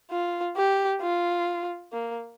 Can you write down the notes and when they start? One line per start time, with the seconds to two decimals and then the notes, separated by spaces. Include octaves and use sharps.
0.11 F4
0.56 G4
1.02 F4
1.93 A#3